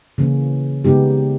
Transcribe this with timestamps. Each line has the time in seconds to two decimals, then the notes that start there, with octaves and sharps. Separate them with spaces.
0.18 C#3 E3 A#3 C#4
0.84 C#3 G#3 B3 D#4 G4